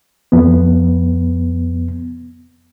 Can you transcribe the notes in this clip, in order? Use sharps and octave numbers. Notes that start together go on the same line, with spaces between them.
F2 B3